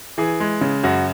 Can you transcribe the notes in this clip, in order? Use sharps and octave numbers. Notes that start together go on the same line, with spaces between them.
E3 G#4
G#3
C#3
F#2 F#4